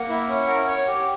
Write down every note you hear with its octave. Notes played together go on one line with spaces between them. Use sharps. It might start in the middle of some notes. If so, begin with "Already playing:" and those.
Already playing: A#3 F#5
E4
C#4
A#4
C#5
G4